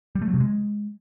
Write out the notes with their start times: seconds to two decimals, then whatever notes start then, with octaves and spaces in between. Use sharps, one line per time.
0.15 G3
0.22 A3
0.28 F#3
0.34 C3
0.40 G#3